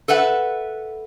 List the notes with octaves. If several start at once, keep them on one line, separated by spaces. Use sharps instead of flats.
A4 B4 E5 F#5